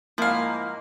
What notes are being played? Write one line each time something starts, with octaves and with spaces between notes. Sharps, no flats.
G#2 F3 A#3 E4 F5